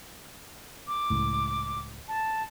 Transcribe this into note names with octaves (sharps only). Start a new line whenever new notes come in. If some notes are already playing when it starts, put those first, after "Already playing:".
D6
C#2 A2
A5